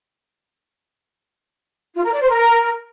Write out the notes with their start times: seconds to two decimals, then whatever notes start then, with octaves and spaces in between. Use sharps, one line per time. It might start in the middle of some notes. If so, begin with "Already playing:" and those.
1.95 F4
2.04 A#4
2.12 D5
2.21 C5
2.29 A#4